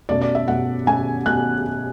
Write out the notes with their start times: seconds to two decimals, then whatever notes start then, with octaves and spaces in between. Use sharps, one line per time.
0.09 B2 A3 C#4 D5
0.22 D5
0.35 E5
0.48 B2 A3 C#4 F#5
0.87 B2 A3 C#4 G#5
1.26 B2 A3 C#4 F#6